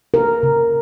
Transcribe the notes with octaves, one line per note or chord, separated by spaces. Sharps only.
C#3 A#4
C#3